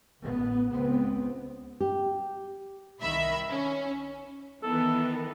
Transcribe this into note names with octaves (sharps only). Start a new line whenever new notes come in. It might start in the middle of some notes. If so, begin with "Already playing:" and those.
A1 B3
C#2 B3 C4
G4
C2 D#3 E5 B5
C#4
D#3 E3 B3 A4